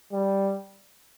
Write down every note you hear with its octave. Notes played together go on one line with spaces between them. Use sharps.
G3